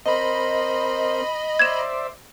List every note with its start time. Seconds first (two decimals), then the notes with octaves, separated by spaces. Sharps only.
0.06 C4 A#4 C5 D#5 B5
1.59 C5 D5 E5 G#6 E7